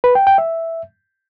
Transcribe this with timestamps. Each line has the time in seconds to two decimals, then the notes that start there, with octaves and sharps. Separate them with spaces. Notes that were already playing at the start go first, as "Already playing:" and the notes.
0.04 B4
0.15 G5
0.27 G5
0.38 E5